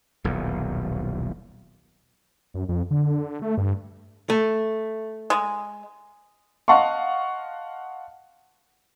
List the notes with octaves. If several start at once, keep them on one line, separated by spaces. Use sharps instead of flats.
D#1 B1 E2
F#2
F2
D3
A3
G2
A3
G#3
D#5 F5 F#5 A5 C6 C#6